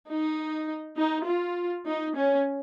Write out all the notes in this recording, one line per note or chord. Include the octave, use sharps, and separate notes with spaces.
D#4
D#4
F4
D#4
C#4